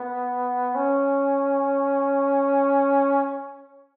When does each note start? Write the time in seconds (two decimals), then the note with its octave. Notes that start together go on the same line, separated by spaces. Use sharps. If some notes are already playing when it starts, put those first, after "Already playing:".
Already playing: B3
0.75 C#4